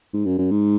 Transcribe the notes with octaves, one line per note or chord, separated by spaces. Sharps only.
G#2
F#2
F#2
G#2